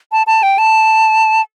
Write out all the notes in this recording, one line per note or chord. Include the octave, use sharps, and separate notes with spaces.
A5
A5
G5
A5